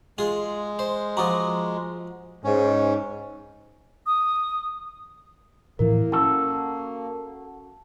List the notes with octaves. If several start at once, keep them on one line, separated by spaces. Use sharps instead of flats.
G#3 F4 G#4
C5
F3 F4 F#4 A#5 D6 D#6
G#2 C#4
D#6
A2 E3 F3 A#3 E4 A#4
C#4 F#4 A4 A5